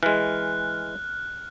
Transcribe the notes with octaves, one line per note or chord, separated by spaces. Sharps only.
E3 G#3 F6 F#6